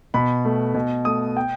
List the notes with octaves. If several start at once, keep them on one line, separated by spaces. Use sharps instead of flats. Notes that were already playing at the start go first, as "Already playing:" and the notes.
B2 B5
A3
B2
A3 D#6
G5